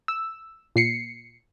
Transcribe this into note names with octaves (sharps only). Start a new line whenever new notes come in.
E6
A#2 C7 C#7